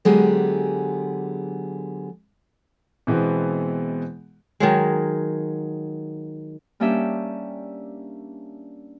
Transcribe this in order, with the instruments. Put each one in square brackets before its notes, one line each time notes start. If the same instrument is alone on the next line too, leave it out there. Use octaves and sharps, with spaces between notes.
[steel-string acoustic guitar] D3 F#3 G#3 B3 G4 G#4
[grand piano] B2 E3 G#3 B3 C4
[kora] D#3 F#3 G#3
[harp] G3 A#3 C#4 D4 G4 E5